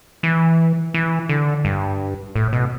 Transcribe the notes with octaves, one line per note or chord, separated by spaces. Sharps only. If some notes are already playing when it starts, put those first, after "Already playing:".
E3
E3
D3
G2
A2
B2